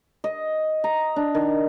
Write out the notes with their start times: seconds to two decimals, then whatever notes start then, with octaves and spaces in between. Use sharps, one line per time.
0.24 D#5
0.84 A#5
1.16 D4
1.35 D#3